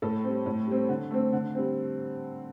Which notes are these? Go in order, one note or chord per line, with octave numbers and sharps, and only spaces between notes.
A2 A4
G3 C4
A2
G3 C4
D3
A3 C4
D3
G3 C4